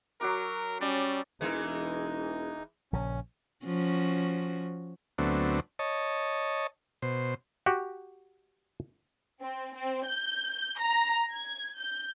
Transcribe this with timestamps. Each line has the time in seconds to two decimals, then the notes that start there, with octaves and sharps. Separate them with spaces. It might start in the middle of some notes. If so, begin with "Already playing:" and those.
0.21 F#3 F#4 A#4 D6
0.81 G3 C#4 D5 C#6
1.41 E1 E3 G#3 A#3 D#4
2.93 A#1 C#3 C#4
3.66 F3 C#4 F#4
5.18 D2 F#3 A3 B3 C4 D4
5.79 C#5 D#5 A5
7.02 B2 C5
7.66 F#4 G4
9.42 C4
9.74 C4
10.06 G6
10.80 A#5
11.32 G#6
11.78 G6